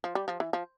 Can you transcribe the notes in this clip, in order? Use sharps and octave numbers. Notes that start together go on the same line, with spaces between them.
F3
G3
F3
E3
F3